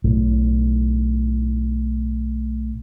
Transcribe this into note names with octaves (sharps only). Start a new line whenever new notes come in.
B1 A2